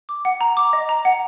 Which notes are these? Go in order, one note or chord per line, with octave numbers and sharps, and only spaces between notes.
D6
F#5
A#5
D6
D#5
A#5
F#5